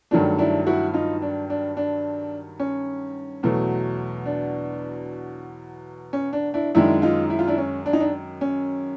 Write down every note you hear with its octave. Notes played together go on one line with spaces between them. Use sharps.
G2 D#3 F#3 A3 D4
D4 E4
E4 F#4
D#4 F4
D4
D4
D4
C#4
E2 B2 F#3 A3
D4
C#4
D4
D4 E4
F#2 D#3 G#3 D4 E4
D#4 F4
E4
F4
D4 E4
C#4
D4
D#4
D4
C#4